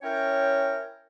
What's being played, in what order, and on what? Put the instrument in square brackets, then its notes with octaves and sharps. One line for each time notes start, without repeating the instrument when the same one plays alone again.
[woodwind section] C#4 E4 A#4 C#5 G5